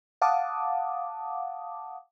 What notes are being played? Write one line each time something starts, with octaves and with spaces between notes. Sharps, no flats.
F5 F#5 A5 D6 D#6